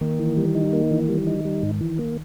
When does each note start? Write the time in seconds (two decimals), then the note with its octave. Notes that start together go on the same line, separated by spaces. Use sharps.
0.01 D#3 A#3
0.19 E3
0.37 G3
0.55 D#4
0.73 A#3
0.91 E3
1.09 G3
1.27 D#4
1.45 G3
1.63 G#2
1.81 E3
1.99 A#3